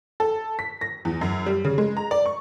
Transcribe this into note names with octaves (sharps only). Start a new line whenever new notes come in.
A4
B6
A#6
E2
F#2
G3
C#3
G#3
A#5
D5
C#6